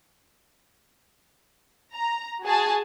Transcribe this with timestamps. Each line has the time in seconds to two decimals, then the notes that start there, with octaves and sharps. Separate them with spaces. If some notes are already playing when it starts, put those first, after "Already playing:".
1.93 A#5
2.44 F#4 G#4 G#5 A5